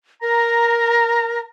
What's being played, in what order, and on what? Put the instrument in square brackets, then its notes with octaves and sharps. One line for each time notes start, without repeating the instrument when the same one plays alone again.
[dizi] A#4 [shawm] A#5